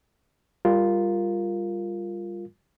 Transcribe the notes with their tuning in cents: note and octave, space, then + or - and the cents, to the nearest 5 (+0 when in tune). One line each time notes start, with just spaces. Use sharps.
G3 +20 F4 +0 A#4 +0